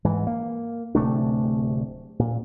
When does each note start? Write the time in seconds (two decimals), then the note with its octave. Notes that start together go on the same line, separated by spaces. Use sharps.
0.05 G#2 E3
0.27 A#3
0.95 D1 C3 A3 D4
2.19 A#2